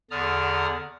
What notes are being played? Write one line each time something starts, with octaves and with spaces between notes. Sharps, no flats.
E2 D3 D5 A#5 D#6 F6